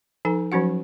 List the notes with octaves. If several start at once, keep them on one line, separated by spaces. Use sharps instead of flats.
F3 D#4 A4 G#5
F3 F#3 C#4 F#4 F#5